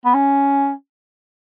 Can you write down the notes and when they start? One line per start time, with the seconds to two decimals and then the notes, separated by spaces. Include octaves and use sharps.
0.05 B3
0.14 C#4